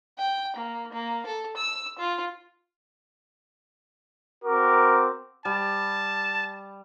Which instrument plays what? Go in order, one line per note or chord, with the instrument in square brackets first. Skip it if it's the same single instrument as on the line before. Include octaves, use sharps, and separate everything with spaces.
[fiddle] G5
A#3
A#3
A4
E6
F4
[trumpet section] C4 F#4 D6 [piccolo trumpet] A#4
[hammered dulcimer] G3 [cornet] A5